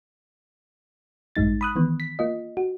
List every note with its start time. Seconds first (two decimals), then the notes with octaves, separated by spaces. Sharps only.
1.36 A1 G2 G#3 D#4 A6
1.61 B5 D#6 F#6
1.76 D#3 E3 B3
2.00 B6
2.19 A#3 F4 D#5
2.57 F#4